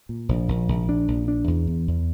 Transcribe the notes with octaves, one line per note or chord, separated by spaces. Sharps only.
A#2
A#1
A#1
A#1
D4
A#1
D4
E2
E2
E2